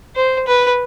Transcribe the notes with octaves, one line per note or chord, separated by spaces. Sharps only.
C5
B4